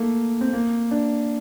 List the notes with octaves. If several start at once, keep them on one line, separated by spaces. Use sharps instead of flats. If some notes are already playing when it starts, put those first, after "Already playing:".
Already playing: A3 A#3
C4
A#3
D4